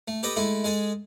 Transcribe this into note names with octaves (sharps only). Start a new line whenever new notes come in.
A3
G4 A4 B4 D#5
G#3 A3 E4 A4
G#3 G#4 A4